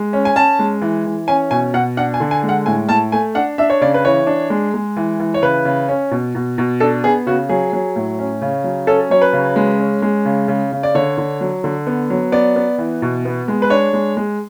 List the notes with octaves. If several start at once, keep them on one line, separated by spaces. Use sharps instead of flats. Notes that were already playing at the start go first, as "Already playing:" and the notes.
Already playing: G#3
C#4
G#5
C#4 A5
G#3
E3
E3
C#4 G#5
B2 G#5
B2 F#5
D4 F#5
G#5
D3
G#5
G#3
F#5
A2 G#5
A2 A5
A3 G#5
D4 F#5
D4 E5
C#5
C#3 D5
B4
E3 C#5
D4
G#3
G#3
E3
E3
C#5
C#3 B4
C#3
C#4
B2
B2
B2
D4 A4
B3 G#4
C#3 F#4
F#3 G#4
F#3
A2
C#4
C#3
F#3
C#4 A4
F#3 C#5
B4
C#3
G#3
C#4
G#3
C#3
C#3
C#3
D5
D3 C#5
D3
F#3
D3
B3
F#3
B3 D5
B3
E3
B2
B3
G#3
B4
D4 C#5
G#3
G#3